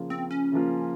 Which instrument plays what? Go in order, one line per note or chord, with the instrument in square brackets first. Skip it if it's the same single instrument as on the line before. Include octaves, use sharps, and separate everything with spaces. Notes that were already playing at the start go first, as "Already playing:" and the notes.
Already playing: [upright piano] C#3 F3 A#3 F4
[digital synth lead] C4
C#4
[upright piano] C#3 F3 A#3 F4